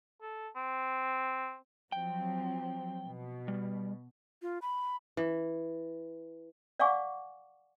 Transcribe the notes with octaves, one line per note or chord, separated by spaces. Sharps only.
A4
C4
F3 F#3 C4 G5
B2
G3
F4
B5
E3
D5 F5 F#5 G#5 C#6 D6